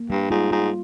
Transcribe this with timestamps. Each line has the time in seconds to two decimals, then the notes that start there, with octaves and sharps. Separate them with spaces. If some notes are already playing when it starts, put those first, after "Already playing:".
Already playing: A#3
0.10 G2 G3
0.31 G#2 F4
0.51 G#2 F4